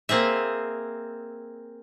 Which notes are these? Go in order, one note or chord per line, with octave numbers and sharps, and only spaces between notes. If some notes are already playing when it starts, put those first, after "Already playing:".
A#3 C4 G#4 E5